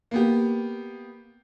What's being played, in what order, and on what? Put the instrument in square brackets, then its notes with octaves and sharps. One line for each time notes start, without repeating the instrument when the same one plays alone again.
[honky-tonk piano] A#3 B3 G4